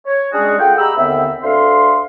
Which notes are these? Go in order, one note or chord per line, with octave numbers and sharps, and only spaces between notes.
C#5
G3 G#3 C#4 D4 F#4 G#4
F4 G#4 A4 F#5 G5
G#3 G4 A#5 B5 E6
D#2 D3 B3 C4 E5
D2 A4 E5 F5 C6